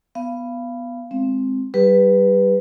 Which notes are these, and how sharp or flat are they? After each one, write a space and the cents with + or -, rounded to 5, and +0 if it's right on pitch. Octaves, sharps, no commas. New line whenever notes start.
B3 +0 F5 -25
G#3 +0 C4 +0
G3 -25 G4 +40 B4 +0